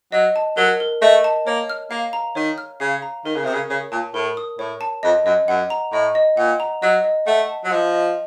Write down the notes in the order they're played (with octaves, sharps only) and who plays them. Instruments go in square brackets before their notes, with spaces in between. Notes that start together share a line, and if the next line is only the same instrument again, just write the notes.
[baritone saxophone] F#3 [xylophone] D#5
[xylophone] A5
[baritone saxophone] F#3 [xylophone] A#4
[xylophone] A#4
[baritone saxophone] A3 [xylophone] D#5
[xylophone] A5
[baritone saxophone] A#3 [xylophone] C#5
[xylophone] F6
[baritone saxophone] A#3 [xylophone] F5
[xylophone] A#5
[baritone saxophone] D#3 [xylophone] C#5
[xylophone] F6
[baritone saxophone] C#3 [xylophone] F5
[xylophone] A#5
[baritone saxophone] D#3 [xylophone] A#4
[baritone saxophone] C#3
[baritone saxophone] C3 [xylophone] D#6
[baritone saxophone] C#3
[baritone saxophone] C#3 [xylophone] C#5
[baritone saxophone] A#2 [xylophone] A5
[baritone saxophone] A2 [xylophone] A#4
[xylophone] D#6
[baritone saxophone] A2 [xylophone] C#5
[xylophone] A5
[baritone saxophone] F2 [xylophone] D#5
[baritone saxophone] F#2 [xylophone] D#5
[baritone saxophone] F#2 [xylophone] F#5
[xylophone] A#5
[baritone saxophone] A2 [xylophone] D#5
[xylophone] D#5
[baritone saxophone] A#2 [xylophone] F#5
[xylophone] A#5
[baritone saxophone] F#3 [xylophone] D#5
[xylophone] D#5
[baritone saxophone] A3 [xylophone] F#5
[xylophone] A5
[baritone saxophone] F#3
[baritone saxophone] F3 [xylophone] D#5
[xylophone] D#5